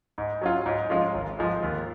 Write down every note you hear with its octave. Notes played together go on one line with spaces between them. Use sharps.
G#2
F#3 C#4 F4
G#2
F3 G#3 C#4 F4
G#1
G#2 F3 G#3
D#2